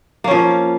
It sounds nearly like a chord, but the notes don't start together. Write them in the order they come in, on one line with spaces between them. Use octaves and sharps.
A#3 C#4 F3